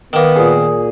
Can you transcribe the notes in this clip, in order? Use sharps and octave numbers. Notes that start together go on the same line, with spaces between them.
D#3 A#3 B3
A#2 G#4